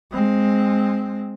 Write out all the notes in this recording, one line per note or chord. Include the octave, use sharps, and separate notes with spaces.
G#3 C4